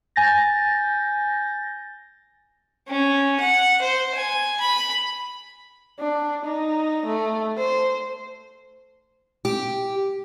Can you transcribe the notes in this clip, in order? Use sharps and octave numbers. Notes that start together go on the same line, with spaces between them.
G#5 G6 A6 A#6
C#4
F#5
C5
G#5
B5
D4
D#4
A3
C5
G4